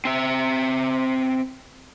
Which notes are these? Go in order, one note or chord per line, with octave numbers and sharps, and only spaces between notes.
C4 E5